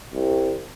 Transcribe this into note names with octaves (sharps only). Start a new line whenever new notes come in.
C2